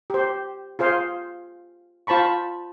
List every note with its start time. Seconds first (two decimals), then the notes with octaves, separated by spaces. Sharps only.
0.10 G4 C5
0.79 F4 G#4 C5 F5
2.07 F4 C5 A5 B5 C#6